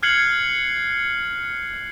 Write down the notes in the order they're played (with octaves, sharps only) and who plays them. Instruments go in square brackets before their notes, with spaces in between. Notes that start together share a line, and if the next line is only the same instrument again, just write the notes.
[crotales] F6 F#6 G#6 C7 C#7 F#7